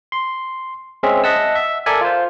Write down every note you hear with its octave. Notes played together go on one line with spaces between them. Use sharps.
C6
G#3 C4 C#4 G#4 E5
D#5 E5 F#5 A5 E6
E5
A4 A#4 D5 E5 G#5
F4 C5